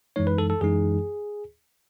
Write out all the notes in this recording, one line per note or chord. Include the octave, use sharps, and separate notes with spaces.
F#2 E3 G#3 D#4 C#5
B4
A4
A4
F#2 E3 G#3 D#4 G#4